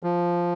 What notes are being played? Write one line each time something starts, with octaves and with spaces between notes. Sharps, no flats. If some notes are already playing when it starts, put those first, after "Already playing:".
F3